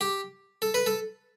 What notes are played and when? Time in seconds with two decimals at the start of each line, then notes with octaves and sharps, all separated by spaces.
0.01 G4
0.62 A4
0.74 B4
0.86 A4